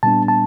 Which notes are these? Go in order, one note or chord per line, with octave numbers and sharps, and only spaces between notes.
A#2 G3 B3 D4 A5
A5